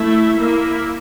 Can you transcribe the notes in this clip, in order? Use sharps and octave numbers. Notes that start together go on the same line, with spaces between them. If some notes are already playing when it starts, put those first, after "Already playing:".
Already playing: A3 E4 A4 E5
A#3 E4 A#4 E5